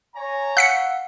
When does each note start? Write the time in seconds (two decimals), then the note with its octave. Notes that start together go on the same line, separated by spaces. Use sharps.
0.16 C#5 G#5 A#5
0.57 F5 F#5 E6 F#6 B6 C#7